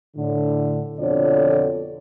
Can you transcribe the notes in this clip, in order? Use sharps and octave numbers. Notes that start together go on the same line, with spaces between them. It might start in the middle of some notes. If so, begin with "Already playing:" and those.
A2 D3
F2 B2 D3 F3 C#5 D5